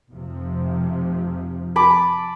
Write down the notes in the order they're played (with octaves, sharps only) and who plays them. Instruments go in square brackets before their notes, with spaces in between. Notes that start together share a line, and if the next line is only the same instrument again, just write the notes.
[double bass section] F1 C3 F3
[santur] A5 B5 D6